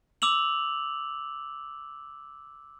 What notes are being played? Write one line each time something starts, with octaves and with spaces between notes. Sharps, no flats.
D6 E6 F7 F#7